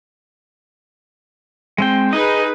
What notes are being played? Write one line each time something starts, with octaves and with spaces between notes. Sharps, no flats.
G#3 C4 G5
D#4 G#4 B4 D#5